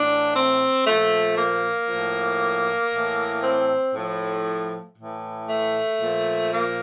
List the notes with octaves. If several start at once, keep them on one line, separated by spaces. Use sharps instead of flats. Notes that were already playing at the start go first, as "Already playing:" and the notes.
Already playing: A2 E3 D4
C4
A#2 F3 A3
A#3
A2 F3
A2 E3
C4
A2 F3
A2 E3
A3
A#2 F3
A#3